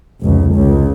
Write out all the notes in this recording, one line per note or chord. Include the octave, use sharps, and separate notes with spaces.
F1 C#2
C#2